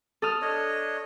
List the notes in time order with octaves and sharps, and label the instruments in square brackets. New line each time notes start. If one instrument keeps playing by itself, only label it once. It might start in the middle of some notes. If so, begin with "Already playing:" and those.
[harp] A4 D#6 F6
[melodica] D4 C#5 D#5